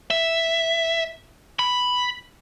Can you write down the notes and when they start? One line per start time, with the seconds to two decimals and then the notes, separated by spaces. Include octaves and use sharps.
0.10 E5
1.59 B5